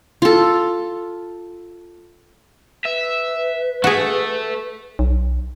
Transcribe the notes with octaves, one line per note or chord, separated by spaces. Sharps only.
F4 A4
B4 E5
A3 F#4 G#4
B1